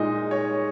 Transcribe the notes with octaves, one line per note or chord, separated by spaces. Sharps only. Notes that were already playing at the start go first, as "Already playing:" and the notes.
Already playing: A#2 G#3 D#4 D#5
C#5